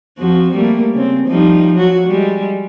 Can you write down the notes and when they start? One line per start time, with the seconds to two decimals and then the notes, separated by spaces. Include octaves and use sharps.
0.18 F2 F3 F#4
0.53 G3 A3 A#3
0.94 C#3 C4
1.28 F3 G3 D#4
1.76 F#3 F#4
2.07 G3 G#3